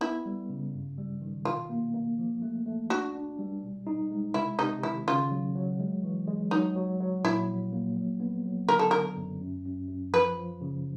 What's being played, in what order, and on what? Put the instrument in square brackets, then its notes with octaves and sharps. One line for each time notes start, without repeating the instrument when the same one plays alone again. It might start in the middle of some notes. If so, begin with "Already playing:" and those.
[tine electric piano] B3 [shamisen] E4
[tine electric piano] G3
C#3
G2
G3
D#3
[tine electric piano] B2 [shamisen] F4
[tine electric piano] A#3
A#3
F3
A3
A3
[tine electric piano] D4 [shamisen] F#4
[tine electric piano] D4
G3
B2
D#4
G#3
[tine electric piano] C3 [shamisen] E4
[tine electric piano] C3 [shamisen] D#4
[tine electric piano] D#3 [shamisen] E4
[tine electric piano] C#3 [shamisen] F4
[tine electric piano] F#3
F#3
G#3
E3
G#3
[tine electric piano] F#3 [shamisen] D#4
[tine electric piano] F#3
F#3
[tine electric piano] A#2 [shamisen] E4
[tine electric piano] F3
A#3
F#3
B3
F#3
[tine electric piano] D3 [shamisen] A#4
[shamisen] A4
[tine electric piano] D3 [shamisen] A#4
[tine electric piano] F#2
F#2
F#2
F#2
[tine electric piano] F3 [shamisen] B4
[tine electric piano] F3
C#3